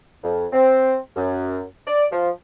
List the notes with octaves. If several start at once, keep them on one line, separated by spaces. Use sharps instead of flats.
F2
C4
F#2
D5
F3